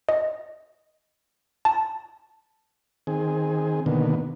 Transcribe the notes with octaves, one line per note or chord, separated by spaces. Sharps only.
D#5
A5
D#3 C4 G#4
B2 D3 D#3 A#3 B3